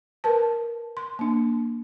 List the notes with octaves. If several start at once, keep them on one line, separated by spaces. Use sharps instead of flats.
A#4 B4 A5
C6
A#3 D4